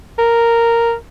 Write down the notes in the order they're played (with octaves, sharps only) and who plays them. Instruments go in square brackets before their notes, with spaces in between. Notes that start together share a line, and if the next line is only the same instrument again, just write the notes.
[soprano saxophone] A#4